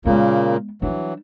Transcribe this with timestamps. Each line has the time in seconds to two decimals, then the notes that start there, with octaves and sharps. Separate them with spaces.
0.05 A#2 C#3 G#3 A#3 B3
0.82 E3 F#3 G3 D4